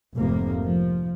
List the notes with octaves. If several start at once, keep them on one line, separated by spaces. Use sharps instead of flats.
F1 F2 G#2 C3 F3 A#3
F3